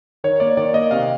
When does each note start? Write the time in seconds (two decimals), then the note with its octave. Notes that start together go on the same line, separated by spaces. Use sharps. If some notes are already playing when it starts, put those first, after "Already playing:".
0.24 D#3 C#5
0.40 A#3 D5
0.57 D#3 D5
0.74 A#3 D#5
0.91 C3 F5